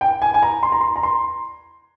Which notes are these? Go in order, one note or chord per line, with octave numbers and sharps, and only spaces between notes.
G5
G#5
G#5
A#5
C6
A#5
C6
A#5
C6